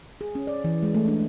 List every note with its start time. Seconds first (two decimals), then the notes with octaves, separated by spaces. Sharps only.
0.21 G#4
0.35 C#4
0.47 D5
0.64 E3
0.83 G#3
0.94 A3
1.08 D4